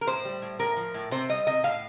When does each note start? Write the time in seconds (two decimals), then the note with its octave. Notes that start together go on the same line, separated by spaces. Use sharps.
0.01 A#4
0.07 A2 C5
0.25 G3
0.42 A2
0.59 A2 A#4
0.77 F3
0.94 A2
1.11 C3 C5
1.29 G3 D#5
1.47 C3 D#5
1.64 A2 F5